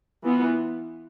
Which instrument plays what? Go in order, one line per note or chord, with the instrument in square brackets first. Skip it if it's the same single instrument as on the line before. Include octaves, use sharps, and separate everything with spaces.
[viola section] E3 B3 F4